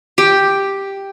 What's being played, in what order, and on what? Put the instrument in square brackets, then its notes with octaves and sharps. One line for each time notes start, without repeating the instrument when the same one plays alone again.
[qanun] G4